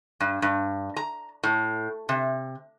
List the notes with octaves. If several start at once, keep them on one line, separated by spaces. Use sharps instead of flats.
G2
G2
A#5
A2
C3